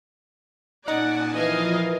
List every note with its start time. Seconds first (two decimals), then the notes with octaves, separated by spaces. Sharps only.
0.88 A#2 C#4 D#4 D5 F#5 G#5 A5
1.35 E3 F3 F4 A#4 D#5 F5 G#5